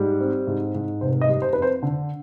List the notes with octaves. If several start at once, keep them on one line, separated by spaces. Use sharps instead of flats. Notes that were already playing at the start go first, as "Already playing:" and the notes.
Already playing: G#2 G3
C4
G#2
G#2
F1 C5
D#5
G3
C5
F2 B4
C5
D3